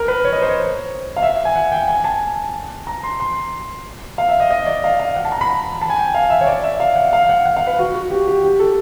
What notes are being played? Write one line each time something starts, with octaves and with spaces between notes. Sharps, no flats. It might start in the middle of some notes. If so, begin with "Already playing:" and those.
Already playing: A#4
B4
C#5
D#5
C5
C#5
F5
E5
G#5
F#5
G5
G#5
A5
A#5
C6
C6
F5
E5
D#5
D#5
D5
F5
F5
F#5
A5
A#5
B5
A5
G#5
G5
F5
E5
C#5
D5
E5
F5
F#5
F5
F#5
F#5
F5
B4
F#4
F#4
G4
G4
G4
A4